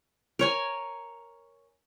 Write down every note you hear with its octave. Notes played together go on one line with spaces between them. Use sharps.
A#4 C#5 G#5